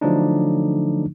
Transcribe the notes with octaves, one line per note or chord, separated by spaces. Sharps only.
D3 F3 F#3 A3 D4 D#4